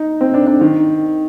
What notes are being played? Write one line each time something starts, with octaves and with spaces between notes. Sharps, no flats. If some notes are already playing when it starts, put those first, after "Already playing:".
Already playing: D#4
C4
D4
D4
D#3